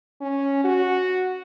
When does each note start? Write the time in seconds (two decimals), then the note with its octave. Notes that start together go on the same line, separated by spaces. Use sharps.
0.21 C#4
0.64 F#4